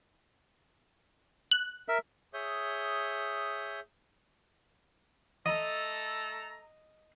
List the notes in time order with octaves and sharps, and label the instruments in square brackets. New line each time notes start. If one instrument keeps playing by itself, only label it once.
[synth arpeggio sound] F#6
[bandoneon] A#4 E5
[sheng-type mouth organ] G#4 C#5 E5 D#6 G6
[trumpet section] A3 A4 A#5 [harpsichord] D#5